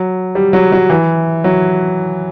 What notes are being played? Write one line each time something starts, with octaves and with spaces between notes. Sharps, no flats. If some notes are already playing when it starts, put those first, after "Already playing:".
Already playing: F#3
G3
F#3
F#3
E3
F#3